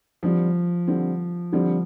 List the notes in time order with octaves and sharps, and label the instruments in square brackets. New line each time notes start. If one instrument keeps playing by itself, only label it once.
[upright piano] D3 G3 C4 [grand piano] F3
[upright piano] D3 G3 C4
[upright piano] D3 G3 C4 [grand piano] F3